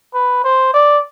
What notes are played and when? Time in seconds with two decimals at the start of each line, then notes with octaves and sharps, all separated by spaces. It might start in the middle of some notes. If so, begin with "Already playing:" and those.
0.14 B4
0.44 C5
0.74 D5